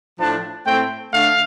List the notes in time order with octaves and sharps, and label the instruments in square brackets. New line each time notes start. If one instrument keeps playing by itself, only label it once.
[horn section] A2 F3 D4 A5
A2 A3 C4 G5
D3 A3 D4 F5